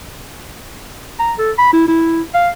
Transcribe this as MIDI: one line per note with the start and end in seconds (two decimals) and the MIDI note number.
1.19 1.33 82
1.39 1.51 69
1.58 1.72 83
1.73 1.88 64
1.88 2.21 64
2.34 2.49 77